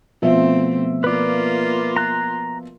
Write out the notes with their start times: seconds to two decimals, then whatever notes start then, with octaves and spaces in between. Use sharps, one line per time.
0.22 B2 F3 A3 C4 E5
1.04 A#3 F4 B4 D5
1.96 A#5 F#6